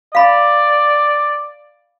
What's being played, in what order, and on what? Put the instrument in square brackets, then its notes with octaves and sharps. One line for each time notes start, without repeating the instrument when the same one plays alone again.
[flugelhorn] D5 [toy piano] F5 B5